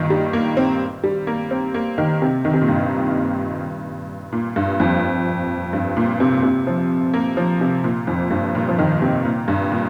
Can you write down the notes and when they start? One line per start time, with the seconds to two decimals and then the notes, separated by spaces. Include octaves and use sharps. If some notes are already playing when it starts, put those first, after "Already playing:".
Already playing: G2 A#2 D#3
0.10 G3
0.33 A#3
0.57 C4
1.04 G3
1.27 A#3
1.51 C4
1.74 A#3
1.98 D#3
2.22 C3
2.45 D#3
2.54 C3
2.61 A#2
2.68 G2
4.32 A#2
4.56 G2
4.80 F2
5.73 G2
5.97 A#2
6.20 C3
6.43 C3
6.67 F3
7.14 A#3
7.37 F3
7.61 C3
7.84 A#2
8.07 F2
8.31 G2
8.55 A#2
8.69 F3
8.78 D#3
9.02 C3
9.25 A#2
9.48 G2
9.72 A#2